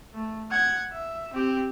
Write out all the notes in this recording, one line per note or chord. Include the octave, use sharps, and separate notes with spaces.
A3
F#5 G#6
E5
C4 G4